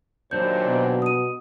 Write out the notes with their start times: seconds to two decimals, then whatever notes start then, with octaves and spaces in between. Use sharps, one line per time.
0.31 D#2 A#2 F#3 D4 C5 C#5 G6
0.67 B2
1.02 D#6 D#7